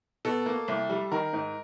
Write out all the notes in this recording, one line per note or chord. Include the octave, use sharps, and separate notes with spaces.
B2 A4
A#3
C2
G3
D#3 A#4
G#2